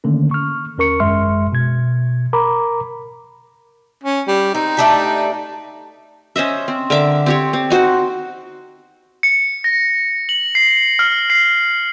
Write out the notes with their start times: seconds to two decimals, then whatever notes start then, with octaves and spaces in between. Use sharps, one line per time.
0.04 D3 D#3 A3 A#3 C#4
0.31 C#6 F6
0.78 D#2 C#4 A#4 C#6 C#7
1.00 G#1 F#2 G#3 E5 C6 F6
1.53 B2 G#6
2.33 A#4 A#5 B5 D6
4.04 C#4
4.28 G3
4.54 C4 D#4
4.77 A3 D4 G4
6.36 C#4 C5 D#5 E5
6.68 C4
6.90 D3 A#4 E5 D6
7.26 C4 G4 C#5
7.53 C4
7.70 D#4 F#4 C5
9.23 C#7
9.64 A#6
10.29 F#7
10.55 C7
10.99 F6
11.30 C7